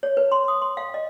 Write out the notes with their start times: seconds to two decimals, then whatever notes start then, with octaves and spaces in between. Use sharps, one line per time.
0.03 C#5
0.17 B4
0.32 C6
0.48 D#6
0.62 C6
0.77 F5
0.94 D#5